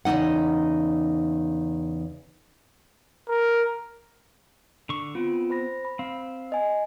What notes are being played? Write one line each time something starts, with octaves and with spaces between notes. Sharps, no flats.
E2 C#3 C4 D#4 F#5
A#4
D3 C#6
B3 C4 F4
C5 B5 A#6
B5
C4 F5
D#5 G#5